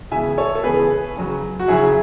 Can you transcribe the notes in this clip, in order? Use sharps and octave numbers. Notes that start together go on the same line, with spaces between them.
C#3 E3 G#3 B3 E5 G#5
A4 C#5
A4
C#3 E3 G#3 B3 G#4 B4
C#3 F#3 C#4
F#4
C#3 F#3 C#4 E4 G#4